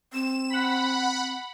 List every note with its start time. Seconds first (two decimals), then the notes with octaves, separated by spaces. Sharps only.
0.13 C4 E7
0.50 F#5 B5